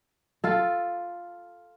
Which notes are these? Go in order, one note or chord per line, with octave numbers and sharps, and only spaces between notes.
F4 A4